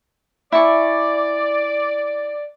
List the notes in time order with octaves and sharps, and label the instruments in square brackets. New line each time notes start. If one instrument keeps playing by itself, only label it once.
[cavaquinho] E4 G#5 C#6 [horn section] D5